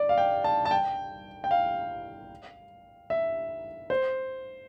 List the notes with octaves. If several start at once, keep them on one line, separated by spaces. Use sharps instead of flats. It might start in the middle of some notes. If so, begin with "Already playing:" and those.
Already playing: D5
F5
G5
A5
A5
G5
G5
F5
E5
C5